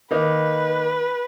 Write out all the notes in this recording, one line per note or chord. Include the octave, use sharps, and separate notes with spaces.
D#3 A#3 D#4 B4